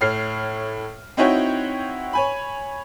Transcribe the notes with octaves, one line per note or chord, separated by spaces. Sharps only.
A2 C#5 F6 C7
C4 D#4 E4 F#4 C#5 G5
C#5 G#5 B5